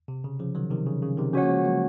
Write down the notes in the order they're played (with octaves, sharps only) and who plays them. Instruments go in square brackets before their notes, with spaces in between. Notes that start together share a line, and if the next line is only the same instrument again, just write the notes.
[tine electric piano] C3
C#3
C#3 F3
D#3 F#3
C3 D#3
C#3
C#3
C3 D#3
[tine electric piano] C#3 F3 [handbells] C#4 F#4 C#5 F#5
[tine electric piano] A#3
F3 G#3
F#3 A#3